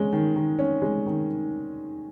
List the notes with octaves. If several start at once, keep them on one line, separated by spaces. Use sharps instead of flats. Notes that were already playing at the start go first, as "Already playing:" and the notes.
Already playing: G#3 C#4
D#3
D#3
C#4
G#3
D#3